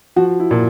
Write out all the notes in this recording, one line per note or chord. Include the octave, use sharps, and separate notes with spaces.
F3 F#4
E4
A#2